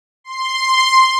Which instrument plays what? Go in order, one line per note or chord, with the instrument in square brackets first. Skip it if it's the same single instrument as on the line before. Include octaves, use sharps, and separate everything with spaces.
[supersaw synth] C6